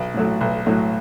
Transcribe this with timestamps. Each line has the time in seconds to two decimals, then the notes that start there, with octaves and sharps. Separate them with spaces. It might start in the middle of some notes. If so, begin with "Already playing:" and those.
Already playing: B1
0.14 A2 F#3 A3
0.41 B1
0.66 A2 F#3 A3